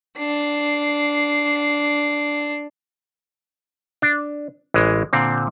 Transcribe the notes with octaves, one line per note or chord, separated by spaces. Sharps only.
D4 C7
D4
A1 E3 G#3
A#2 D3 C4